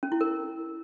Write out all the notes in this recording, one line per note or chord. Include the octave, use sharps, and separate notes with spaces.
C#4
E4
A#4